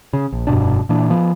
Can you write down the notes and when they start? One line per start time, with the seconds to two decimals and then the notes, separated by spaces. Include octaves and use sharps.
0.13 C#3
0.32 A#1
0.47 F1 G2 B2 D4
0.89 A#2 E3 D4
1.10 F3 B3